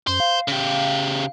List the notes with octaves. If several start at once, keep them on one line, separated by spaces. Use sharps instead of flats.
F#2 C5
F5
C#3 G4